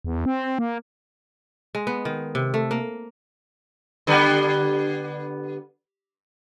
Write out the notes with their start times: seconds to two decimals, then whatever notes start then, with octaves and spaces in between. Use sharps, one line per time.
0.05 E2
0.26 C4
0.59 A#3
1.75 G#3
1.87 B3
2.05 D#3
2.35 C3
2.54 A3
2.71 A#3
4.07 D3 G3 B3